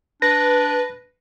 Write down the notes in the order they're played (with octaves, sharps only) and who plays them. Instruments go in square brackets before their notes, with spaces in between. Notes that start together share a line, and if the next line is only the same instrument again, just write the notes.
[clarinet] D4 [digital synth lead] B4 [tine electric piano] A#6